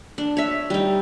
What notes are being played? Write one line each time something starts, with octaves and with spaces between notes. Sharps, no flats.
D4
C#5 E5
G3 D#4